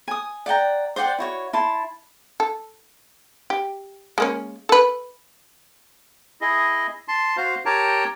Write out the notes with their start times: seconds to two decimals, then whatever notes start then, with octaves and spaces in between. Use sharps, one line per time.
0.08 G#5 D#6
0.46 D5 F#5 G5 A#5
0.96 C5 D5 F#5 G5
1.19 E4 F#4 C#5
1.53 E4 A5 C6
2.40 A4
3.50 G4
4.18 G#3 A#3 C#4
4.69 A4 B4
6.41 E4 G#4 D#5
7.08 A5 C6
7.37 F#4 C5 F5
7.66 G4 A#4 C#5 G5 A5 A#5